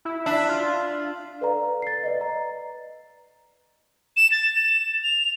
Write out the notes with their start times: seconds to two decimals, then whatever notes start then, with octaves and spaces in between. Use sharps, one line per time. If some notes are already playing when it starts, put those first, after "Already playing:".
0.05 E4
0.26 D4 E5
0.49 F4
1.41 A4 B4 D5 F5 A#5
1.82 A6 C7
2.04 B4 D5 D#5
2.21 A#5
4.17 E7
4.32 A6
4.53 E7
5.04 F7